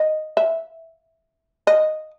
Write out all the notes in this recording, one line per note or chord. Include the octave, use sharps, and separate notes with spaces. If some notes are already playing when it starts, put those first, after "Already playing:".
Already playing: D#5
E5
D#5